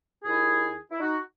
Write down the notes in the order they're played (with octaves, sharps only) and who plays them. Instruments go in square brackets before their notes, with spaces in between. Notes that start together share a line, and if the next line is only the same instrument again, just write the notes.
[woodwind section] D#2 D#3 E4 G#4
E4
D#4 F#4